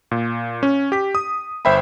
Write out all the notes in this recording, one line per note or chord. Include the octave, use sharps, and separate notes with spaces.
A#2
C#4
G4 B6
D#6
G1 C5 E5 G5 B5